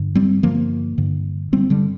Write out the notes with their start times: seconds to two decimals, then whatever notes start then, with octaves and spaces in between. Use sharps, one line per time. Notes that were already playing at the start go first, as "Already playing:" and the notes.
Already playing: G2 D3
0.15 G3 C4
0.43 G2 D3 F3 A#3
0.98 G2 D3
1.52 G2 D3 G3 C4
1.70 D3 G3